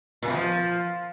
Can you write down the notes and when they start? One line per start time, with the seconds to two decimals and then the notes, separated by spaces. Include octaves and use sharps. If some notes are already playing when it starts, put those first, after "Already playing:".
0.23 A#2
0.28 B2
0.33 F3